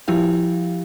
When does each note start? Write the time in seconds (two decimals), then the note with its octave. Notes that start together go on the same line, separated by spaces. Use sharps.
0.08 F3 G3 E4 G4 F5